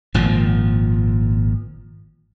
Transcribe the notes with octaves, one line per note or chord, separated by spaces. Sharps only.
G#1 A#2 F3